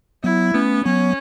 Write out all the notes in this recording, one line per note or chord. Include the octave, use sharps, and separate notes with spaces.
F#3 B3 E4
A3 B3 C#4
F#3 B3 C#4